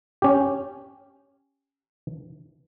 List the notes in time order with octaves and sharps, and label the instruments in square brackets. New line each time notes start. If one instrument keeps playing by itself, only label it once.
[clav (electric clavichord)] C#4 G4